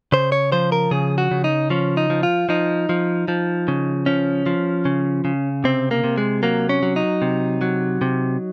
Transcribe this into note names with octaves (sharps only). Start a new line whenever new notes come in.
C#3 C5
C#5
F3 C5
A#4
C#3 G#4
F#4
C#3
D#4
F3 C#4
D#4
F3
F4
F3 D#4
F3
F3
C#3
F3 C#4
F3
C#3
C#3
C3 C4
A#3
C3
G#3
F#3 A#3
C#4
F#3
D#4
C3
F#3
C3